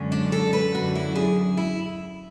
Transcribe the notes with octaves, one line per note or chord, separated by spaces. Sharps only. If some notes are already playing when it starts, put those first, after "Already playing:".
Already playing: F#2 D3 G#3 C#4
D4
A4
B4
F#2 D3 F#3 F#4
E4
G#4
E4